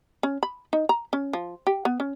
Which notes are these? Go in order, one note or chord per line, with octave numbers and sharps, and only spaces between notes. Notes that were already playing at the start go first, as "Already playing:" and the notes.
C#4
B5
D#4
A#5
C#4
F3
G4
B3
C#4